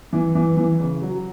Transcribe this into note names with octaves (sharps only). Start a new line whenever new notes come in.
E3
E3
E3
C#3
F#3